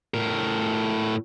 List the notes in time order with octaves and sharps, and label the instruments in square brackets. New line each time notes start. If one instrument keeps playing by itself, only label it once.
[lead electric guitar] A2 A#4